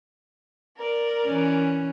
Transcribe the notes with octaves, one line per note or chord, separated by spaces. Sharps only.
A#4 D5
E3 C#4